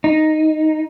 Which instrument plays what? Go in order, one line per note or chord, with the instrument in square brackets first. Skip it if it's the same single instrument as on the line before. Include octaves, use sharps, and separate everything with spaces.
[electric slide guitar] D#4